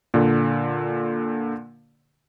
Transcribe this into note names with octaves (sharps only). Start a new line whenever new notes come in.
A#2 D3